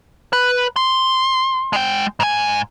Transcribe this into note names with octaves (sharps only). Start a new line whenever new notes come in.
B4
C6
G#3 G5
G#2 G#5